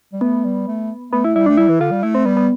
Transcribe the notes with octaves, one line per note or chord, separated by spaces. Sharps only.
G3
A3 B3
G3
A3
A3 B3
E4
G3 E4
A3 D4
G3 E4
E3
D3 F4
G3
A3 E4
C4
G3 B3
B3